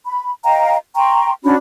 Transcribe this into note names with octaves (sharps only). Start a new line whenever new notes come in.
B5
D#5 F5 G5 A#5
G5 A#5 C6 C#6
C#4 D4 F#4 B5